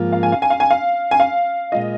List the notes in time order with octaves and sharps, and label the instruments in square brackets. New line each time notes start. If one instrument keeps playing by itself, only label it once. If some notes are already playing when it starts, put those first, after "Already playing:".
Already playing: [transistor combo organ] G#2 F3 A#3 F4
[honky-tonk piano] F5
G#5
F5
G#5
F5
G#5
F5
G#5
F5
[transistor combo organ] A#2 G#3 F4 [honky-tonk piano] D#5